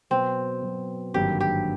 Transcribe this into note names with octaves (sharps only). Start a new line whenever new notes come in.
B2 F#3 B3 C4
B2 F#3 B3
G#1 G2 D3 F#3 A#3 G4
G4